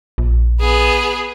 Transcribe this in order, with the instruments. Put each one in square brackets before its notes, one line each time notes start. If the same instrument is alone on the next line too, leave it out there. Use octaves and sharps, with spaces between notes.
[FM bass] A#1
[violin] B3 G#4